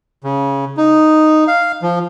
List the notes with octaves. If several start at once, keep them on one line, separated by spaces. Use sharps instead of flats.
C#3
D#4
F5
F3